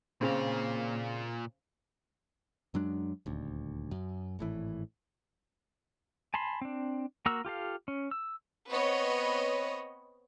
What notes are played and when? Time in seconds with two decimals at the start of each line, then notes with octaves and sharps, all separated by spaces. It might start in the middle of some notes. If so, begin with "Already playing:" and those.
0.21 A#2 C#3 C4 F5
2.74 F#2 F#3 G#3 D4
3.26 D#1 D2
3.91 F#2
4.39 G#1 A2 E3
6.34 G#5 A5 B5 C6
6.61 C4 D4
7.26 A#3 F#4 A#4 A#5 E6
7.45 F4 G4 A4 F5
7.88 C#4
8.11 E6
8.69 B3 C4 B4 C#5 D#5